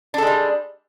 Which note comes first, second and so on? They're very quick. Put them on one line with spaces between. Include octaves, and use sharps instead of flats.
D4 A4 G#3 G3